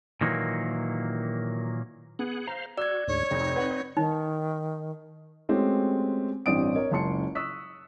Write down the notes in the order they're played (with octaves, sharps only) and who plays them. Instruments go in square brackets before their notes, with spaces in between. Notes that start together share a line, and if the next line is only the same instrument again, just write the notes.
[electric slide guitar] A#2 D#3 E3 F#3 A#3
[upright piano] B3 [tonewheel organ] G#4 F#5
[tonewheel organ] C5 F5 [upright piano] A#5
[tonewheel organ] F#4 [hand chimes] D5 G#6 [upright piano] E6
[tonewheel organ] D2 G#2 [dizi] C#5
[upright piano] F1 F2 [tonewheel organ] C4 D#4
[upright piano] B4 F#5
[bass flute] D#3 [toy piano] D#4
[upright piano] G#3 A3 C4 C#4 F#4 G4
A1 G2 C4 D4 D#6 D7
A#4 C#5 D#5
F#1 C#2 A5 C6 C#7
C#6 D#6 E6 F#6 B6